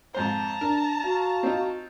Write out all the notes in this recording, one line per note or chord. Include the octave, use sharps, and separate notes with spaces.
F2 G#2 C5 A5 A#5
D4 A#4
F#4 F5
C4 D#4 F4